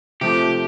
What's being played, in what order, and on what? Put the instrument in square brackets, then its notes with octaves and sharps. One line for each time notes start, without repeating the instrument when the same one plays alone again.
[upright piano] C3 F3 A3 [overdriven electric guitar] G4